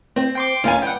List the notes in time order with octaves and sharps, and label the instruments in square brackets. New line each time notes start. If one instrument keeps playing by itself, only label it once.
[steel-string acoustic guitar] C4 C5
[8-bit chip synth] G5 C6 D6
[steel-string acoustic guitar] D#2 F5 G#5 [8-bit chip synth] C#4
[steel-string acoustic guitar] G2 [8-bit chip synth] F#5 G5